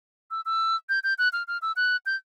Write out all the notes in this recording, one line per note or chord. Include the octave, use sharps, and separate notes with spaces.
E6
E6
G6
G6
F#6
F6
F6
E6
F#6
G6